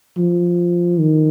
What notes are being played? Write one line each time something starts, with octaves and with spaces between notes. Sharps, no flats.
F3
D#3